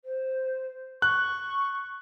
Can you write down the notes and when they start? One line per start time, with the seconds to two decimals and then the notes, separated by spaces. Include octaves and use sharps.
0.05 C5
1.02 C#6 F#6